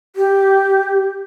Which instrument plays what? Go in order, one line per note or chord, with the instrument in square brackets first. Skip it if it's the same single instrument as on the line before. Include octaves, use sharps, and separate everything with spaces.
[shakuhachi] G4